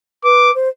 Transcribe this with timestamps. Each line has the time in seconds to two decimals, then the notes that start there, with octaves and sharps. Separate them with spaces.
0.24 B4 D6
0.55 C5